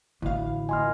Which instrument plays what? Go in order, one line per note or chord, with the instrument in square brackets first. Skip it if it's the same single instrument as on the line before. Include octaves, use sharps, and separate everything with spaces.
[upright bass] A1 [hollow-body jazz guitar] D2 F5 [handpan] E4
[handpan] A#3 F4 D#5 [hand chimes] G#5 C6 F6